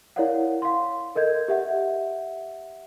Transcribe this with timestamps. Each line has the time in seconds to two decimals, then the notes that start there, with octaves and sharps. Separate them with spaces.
0.16 E4 A#4 C#5 D5 F5 F#5
0.62 F5 C6
1.15 A4 A#4 D#5 G6 G#6
1.48 G4 E5 F#5